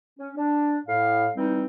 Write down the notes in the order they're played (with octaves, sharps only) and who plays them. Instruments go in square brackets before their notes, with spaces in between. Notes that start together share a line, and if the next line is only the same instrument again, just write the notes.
[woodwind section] C#4
D4
A2 F5
E3 G3 C4 D#4